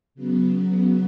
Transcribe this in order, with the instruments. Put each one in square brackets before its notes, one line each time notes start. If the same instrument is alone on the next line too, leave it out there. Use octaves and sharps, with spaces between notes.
[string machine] C#3 F#3 B3